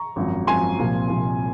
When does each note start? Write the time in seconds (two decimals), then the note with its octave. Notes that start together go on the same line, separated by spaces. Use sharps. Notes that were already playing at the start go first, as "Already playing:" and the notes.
Already playing: A#5 C#6
0.16 G#1 F#2 F3
0.47 G#1 F#2 F3 G#5 C6
0.79 C2 A#2 F3
1.10 C2 A#2 F3